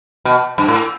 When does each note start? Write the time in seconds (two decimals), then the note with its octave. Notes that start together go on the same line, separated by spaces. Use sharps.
0.25 B2
0.58 G2
0.68 A2